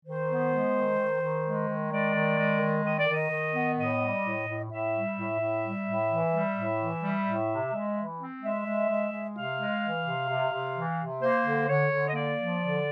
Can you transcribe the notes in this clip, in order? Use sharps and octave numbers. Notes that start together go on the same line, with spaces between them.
D#3 C5
B3
G#3
D#3
D#3
D#3
G#3
D#3
G#3 D5
D#3
G#3
D#3
D#3 D#5
D5
D#3 D#5
D#3
B3
A2 D#5
G3
A2
A2
A2 E5
G3
A2
A2
G3
A2
E3
G3
A2
E3
G3
A2
C3
G#3
E3
C4
G#3 E5
G#3
G#3
G#3
C3 F5
G#3
E3
C3
C3
C3
E3
C3
A#3 C5
D3
D3 C#5
D3
D#5
A#3 D5
F3
D3